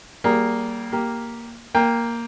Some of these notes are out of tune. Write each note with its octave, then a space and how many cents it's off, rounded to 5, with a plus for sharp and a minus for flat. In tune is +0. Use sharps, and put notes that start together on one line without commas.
G3 -25 A#3 +0 G#4 -15
A#3 +0 G4 +0
A#3 +0 G5 +15